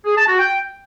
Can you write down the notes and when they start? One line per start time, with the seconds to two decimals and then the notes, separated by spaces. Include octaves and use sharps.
0.06 G#4
0.17 A5
0.28 F#4
0.39 G5